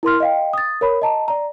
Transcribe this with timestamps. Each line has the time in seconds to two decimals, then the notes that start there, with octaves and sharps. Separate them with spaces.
0.03 E4 A#4 C6 F6
0.20 D#5 F5 G5
0.53 D#6 A6
0.81 A#4 C#5 B5
1.02 D#5 A5 A#5
1.28 D5 A#5